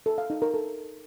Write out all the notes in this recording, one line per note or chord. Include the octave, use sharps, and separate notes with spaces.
A4
F5
D#4
A#4
A4